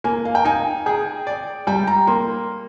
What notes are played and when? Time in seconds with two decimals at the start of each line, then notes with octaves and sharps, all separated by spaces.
0.04 A#3 G#5
0.25 F5
0.35 G5
0.45 D#4 G#5
0.86 G#4 G5
1.27 D5
1.67 G3 G5
1.87 A#5
2.07 A#3 C6